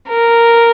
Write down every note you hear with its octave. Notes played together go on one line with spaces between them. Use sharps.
A#4